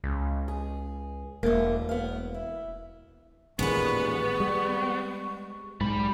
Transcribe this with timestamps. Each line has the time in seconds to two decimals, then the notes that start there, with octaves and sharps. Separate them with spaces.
0.04 C#2
0.48 G#4
1.43 E1 A3 A#3
1.89 B3 F5
2.34 E4
3.59 A1 D#2 A#2 G#3 B3 B4 C#6
4.40 G3
5.81 B1 G#2 G3 B5